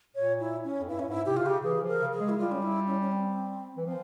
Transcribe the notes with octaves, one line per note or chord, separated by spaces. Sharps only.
A#2 C#5
E4
C#4
F2
G2 E4
C#4
G#2 E4
C3 G4
C3 F4
C#3 G4
E3 G#4
F3
A#4
C#3
G#4
G#3
E4
G3 F4
C#4
E4
C#4
C#4
C4
E3
F3 C4